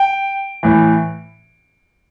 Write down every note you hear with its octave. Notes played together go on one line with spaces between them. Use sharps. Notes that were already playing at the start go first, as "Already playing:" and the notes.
Already playing: G5
A2 E3